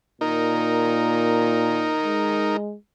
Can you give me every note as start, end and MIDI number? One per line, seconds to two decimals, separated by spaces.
0.21 1.99 46
0.21 2.57 63
0.21 2.57 70
2.05 2.75 56